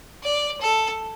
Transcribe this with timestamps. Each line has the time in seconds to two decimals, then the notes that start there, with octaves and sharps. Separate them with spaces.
0.23 D5
0.61 A4